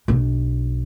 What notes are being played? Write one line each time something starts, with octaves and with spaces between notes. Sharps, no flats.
B1 D4